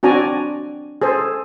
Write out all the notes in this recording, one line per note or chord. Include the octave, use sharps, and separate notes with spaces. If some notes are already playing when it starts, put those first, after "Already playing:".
C4 D4 F#4 D5 G#5 A#5
G#4 A4 C5